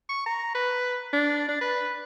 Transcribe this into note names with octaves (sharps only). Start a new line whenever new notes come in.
C#6
A#5
B4
D4
D4
B4